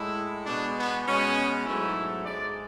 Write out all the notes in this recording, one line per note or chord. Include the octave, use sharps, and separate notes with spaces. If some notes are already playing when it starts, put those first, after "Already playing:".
Already playing: A2 G#3 E4
B2 G#3 D4
B3
B2 G#3 C#4
G#2 F#3 A3 E4
G#2 G#3 D5